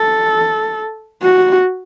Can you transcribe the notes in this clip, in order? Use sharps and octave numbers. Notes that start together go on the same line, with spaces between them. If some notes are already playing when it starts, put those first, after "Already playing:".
Already playing: A4
F#4